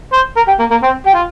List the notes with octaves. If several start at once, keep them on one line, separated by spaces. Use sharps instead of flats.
C5
A#4
G4
A#3
A#3
C4
G4
F4